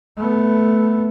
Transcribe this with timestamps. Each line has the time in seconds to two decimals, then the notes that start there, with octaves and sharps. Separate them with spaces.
0.17 A3 B3